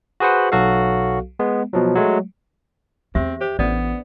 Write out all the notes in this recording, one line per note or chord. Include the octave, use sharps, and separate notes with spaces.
F#4 G#4 B4 C5 F#5
B1 F#3 F#4 A4 F5
G#3 B3
B2 F3 F#3
F#3 G#3 A3
E2 C4 G4 C5 E5
G4 C5
A1 B3 D4 D5